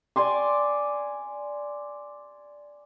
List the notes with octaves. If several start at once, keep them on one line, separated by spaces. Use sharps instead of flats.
D5 G#5 C6 D6